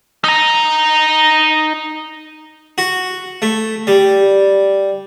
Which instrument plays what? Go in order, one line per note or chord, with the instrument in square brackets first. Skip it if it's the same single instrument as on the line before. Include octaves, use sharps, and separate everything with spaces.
[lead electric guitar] D#4 A#5
[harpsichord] F#4
A3
G3